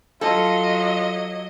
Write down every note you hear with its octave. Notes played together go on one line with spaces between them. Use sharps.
F#3 F4 A4 D#5